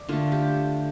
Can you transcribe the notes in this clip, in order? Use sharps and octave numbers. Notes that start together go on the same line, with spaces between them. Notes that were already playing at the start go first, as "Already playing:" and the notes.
Already playing: D5
D3 A3 F4
G4